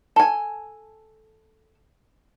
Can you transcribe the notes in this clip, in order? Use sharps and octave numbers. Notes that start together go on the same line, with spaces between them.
A4 G#5